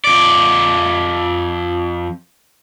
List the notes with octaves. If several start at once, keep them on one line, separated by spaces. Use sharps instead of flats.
F2 D5